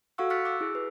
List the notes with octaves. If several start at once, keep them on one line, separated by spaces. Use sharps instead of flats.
F#4 A4 F5 F#5 C#6 E6
C#6 F6 F#6 A6 B6 C#7
D6 E6
E4 G#4
B4